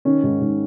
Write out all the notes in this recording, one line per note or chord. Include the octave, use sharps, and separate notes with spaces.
D#3 C#4
G#2
G#2